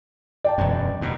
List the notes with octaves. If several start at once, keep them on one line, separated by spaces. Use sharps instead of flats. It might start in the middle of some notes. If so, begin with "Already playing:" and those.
D5 G5 A5
E1 F#2
D#2 B2